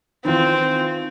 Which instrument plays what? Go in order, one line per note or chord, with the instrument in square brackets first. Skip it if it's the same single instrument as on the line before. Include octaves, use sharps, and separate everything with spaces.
[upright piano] D#3 E3 F4 [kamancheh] C4